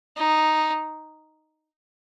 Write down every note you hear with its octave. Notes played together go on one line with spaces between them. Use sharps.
D#4